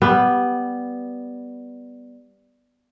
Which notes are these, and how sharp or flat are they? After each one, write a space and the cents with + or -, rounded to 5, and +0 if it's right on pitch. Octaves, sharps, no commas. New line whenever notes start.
G3 +0 B3 +0